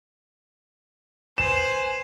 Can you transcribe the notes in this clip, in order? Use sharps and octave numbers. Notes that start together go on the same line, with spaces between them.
B4 C5 G#5 E7